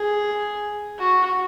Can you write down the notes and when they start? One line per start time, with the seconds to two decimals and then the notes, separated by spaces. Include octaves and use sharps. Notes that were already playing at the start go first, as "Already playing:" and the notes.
Already playing: G#4
0.99 F#4